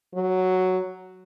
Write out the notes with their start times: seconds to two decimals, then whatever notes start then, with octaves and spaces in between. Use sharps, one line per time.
0.15 F#3